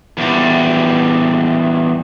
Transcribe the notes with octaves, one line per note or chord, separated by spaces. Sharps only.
E2 G3